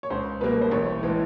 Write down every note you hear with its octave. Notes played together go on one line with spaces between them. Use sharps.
C#5
C#2 C5
B2 G3 A#3 B4
C5
A1 C#5
A2 E3 G#3